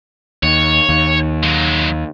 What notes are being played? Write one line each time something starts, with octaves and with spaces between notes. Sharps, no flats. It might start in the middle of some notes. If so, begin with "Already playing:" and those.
D#2 C#5
D#2
F#3 G#3